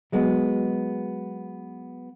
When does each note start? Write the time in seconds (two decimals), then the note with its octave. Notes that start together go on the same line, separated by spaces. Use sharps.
0.12 F#3 G#3 B3